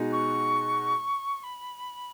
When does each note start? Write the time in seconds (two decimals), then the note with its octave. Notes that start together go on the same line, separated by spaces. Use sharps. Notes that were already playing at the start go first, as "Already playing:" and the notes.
Already playing: B2 G#3 D#4 F#4
0.12 C#6
1.43 B5